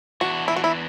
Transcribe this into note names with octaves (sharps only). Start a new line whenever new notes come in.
E2 E3 D4 F#4
E4
F#4
E4